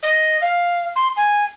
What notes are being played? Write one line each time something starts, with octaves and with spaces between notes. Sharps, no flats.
D#5
F5
C6
G#5